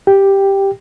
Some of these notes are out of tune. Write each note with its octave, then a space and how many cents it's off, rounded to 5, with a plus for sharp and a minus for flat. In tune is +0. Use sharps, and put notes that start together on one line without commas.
G4 +0 G5 +5